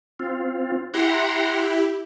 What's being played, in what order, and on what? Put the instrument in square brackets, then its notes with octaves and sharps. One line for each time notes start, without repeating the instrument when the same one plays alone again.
[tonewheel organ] C4 F4
[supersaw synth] E4 G4 [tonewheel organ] F#5 A#5 C6